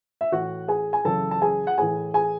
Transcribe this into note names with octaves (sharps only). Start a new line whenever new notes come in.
E5
A2 E3 F#4 F#5
G#4 G#5
G#5
F#2 C#3 E3 A4 A5
A5
G#4 G#5
F#5
A2 E3 G#4 G#5
G#4 G#5